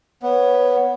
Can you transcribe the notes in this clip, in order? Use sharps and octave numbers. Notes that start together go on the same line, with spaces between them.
B3 C#5